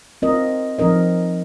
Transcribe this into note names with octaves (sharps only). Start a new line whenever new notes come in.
C4 F4 A#4 D#5
F3 C4 D#4 A#4 D#5